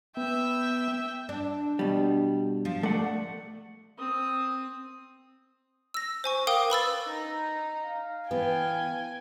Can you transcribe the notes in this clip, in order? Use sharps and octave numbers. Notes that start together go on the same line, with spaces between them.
B3 E5 G5
D4
B2 G3
F3
A3 D5 F#5
C4 D#6
E6 A#6
C5 G#5 C#6
A#4 F5 G5 D6 D#6
B4 B5 E6 A6
D#4
F5
E3 B3 G5 G#5